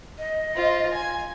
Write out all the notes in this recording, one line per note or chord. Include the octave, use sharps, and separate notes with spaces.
D#5
F4 C5
G#5